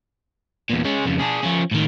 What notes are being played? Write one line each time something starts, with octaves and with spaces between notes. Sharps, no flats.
E2 A#2
G#3 C#4
F2 C#3
D4 G#4
F3 C#4
A2 D#3